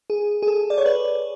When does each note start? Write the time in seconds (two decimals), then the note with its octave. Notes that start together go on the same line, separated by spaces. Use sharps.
0.10 G#4
0.42 G#4
0.47 A4
0.70 D5
0.78 C#5
0.86 B4